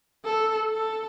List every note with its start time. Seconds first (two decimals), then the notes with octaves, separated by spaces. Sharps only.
0.25 A4
0.72 A4